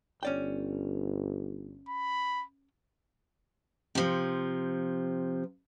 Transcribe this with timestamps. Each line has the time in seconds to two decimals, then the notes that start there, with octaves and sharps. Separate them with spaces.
0.23 G1 C#4 D5 G5
1.88 B5
3.95 C3 F3